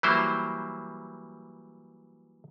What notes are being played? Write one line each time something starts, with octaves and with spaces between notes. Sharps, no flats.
E3 F#3 G3 A#3 E4 C5